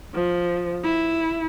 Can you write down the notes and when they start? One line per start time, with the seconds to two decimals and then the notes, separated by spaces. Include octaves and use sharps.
0.14 F3
0.84 E4